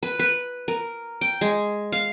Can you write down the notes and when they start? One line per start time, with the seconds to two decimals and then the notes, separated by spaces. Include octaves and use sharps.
0.03 B4
0.19 B4
0.68 A#4
1.21 G5
1.41 G#3
1.92 F5